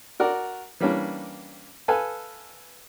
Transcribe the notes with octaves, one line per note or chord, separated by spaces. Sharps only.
F#4 A#4 D5 F#5
E3 G3 A#3 C#4 D4
A4 B4 F5 G#5